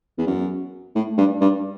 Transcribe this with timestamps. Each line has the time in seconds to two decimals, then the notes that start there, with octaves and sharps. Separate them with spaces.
0.18 E2
0.27 F#2
0.95 A2
1.18 G2
1.41 G2